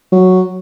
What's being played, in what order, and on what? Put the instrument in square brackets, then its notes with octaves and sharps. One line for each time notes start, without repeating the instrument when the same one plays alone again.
[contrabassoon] F#3